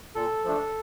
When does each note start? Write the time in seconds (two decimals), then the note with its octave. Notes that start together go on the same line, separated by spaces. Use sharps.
0.15 A#2 A4
0.44 F3 A3 D4